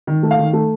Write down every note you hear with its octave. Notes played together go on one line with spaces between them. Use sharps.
D#3
A3
F5
D#3
A3